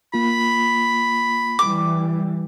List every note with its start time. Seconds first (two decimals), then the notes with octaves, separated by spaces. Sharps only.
0.14 A#3 F4 B5
1.59 E3 G3 D6